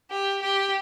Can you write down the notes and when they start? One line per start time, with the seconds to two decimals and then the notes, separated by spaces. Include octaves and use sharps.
0.11 G4
0.43 G4